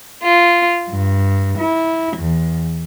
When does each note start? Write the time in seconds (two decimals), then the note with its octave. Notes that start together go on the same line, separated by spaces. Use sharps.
0.23 F4
0.91 G2
1.59 E4
2.17 E2